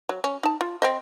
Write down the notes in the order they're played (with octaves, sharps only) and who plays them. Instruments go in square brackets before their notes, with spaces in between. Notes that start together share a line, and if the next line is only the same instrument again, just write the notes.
[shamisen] F#3
C#4
D#4 A5
F4
C4 C5 D#5